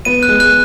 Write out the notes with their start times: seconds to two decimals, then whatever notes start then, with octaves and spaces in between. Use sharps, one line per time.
0.05 B3 D#7
0.23 F#6
0.29 G#3
0.40 F#6